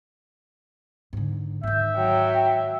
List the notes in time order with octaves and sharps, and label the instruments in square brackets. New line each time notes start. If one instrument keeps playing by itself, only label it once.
[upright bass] G#2 D3
[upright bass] G#2 D#3 [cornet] E5 [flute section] G6
[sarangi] F#3 [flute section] G5